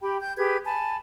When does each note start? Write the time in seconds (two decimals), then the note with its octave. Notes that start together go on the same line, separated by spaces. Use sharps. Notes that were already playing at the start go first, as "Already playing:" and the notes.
0.01 G4 G5 B5
0.21 G5 G6
0.36 G4 G#4 B4 G#6
0.64 G#5 A5 B5